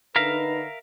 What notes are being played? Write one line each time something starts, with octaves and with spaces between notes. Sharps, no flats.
D3 D#4 A#4 B4 E5 F5